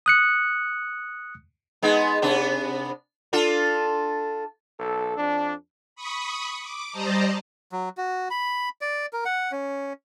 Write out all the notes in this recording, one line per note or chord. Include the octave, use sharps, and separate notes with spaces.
D#6 F#6 C#7
G#3 B3 D#4
C3 B3 D4
D4 F4 A4
B1 A4
F2 D4
B5 C#6 D#6
D6
G3 C5 D5 D#5 A5 A#5
F#3
F#4
B5
D5
A#4
F#5
C#4